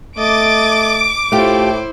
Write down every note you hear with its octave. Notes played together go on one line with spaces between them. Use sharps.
A3 D#5 D6 A6 D7
A2 A3 E4 F4 G4 C5